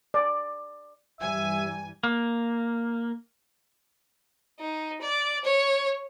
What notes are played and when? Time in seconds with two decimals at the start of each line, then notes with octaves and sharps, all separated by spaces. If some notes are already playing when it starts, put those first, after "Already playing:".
0.14 D5
1.20 G2 E3 G3 E5 G#5
2.03 A#3
4.60 D#4
5.01 D5
5.44 C#5